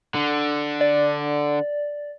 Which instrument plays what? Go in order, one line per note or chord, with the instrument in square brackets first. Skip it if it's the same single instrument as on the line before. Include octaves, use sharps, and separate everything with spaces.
[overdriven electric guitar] D3
[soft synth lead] D5